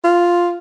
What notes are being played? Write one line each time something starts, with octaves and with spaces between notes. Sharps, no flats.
F4